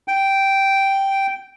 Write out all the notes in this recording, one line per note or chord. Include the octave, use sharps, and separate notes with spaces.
G5